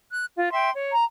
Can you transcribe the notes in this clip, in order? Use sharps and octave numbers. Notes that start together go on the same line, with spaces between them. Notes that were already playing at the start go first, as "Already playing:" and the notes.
F#6
F4
E5 G5 C6
C#5
A#5